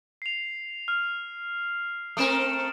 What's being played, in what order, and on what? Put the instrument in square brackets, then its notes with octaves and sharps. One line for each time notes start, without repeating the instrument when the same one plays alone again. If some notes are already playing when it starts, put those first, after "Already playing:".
[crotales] C7 F7
F6
[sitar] A3 C4 A#4 [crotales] D#6 D7 E7